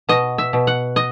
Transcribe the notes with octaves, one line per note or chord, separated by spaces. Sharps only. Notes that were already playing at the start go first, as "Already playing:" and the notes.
B2 D#5
E5
B2
F#5
D#5